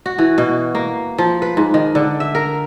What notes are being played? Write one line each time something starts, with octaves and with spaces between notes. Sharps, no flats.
F#4
E3
B2
A#3
F3
B4
G#2
D#3
D3
E5
A#4